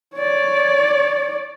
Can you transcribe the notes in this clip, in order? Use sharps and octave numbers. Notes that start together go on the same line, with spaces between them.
C#5 D5